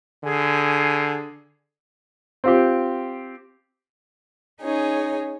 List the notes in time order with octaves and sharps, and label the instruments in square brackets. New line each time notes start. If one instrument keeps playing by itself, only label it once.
[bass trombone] D3 [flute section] G#4 G#5
[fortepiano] C4 F4 G4
[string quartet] C#4 D#4 G#4 C#5